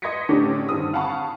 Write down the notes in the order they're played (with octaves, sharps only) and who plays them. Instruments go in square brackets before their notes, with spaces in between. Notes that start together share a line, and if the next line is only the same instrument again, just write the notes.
[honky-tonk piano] D#5 C6 G#6 A#6 B6 C#7
A2 D3 C#4 D4 G4
G2 D3 D#3 C4 D#6
F5 F#5 G#5 A5 B5 C#6